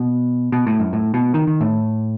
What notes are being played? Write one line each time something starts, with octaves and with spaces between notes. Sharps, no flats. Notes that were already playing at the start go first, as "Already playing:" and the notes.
Already playing: B2
B2
A2
F#2
A2
B2
D#3
D#3
A2